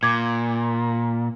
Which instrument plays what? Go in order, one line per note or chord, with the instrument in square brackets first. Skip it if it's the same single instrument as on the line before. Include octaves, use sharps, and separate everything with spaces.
[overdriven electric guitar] A#2 [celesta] D6 G#6